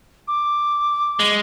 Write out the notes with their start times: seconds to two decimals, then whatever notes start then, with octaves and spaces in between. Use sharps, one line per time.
0.28 D6
1.19 G#3